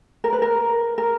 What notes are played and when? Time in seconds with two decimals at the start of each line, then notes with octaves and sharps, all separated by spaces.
0.24 A#4
0.33 B4
0.42 A#4
0.98 A#4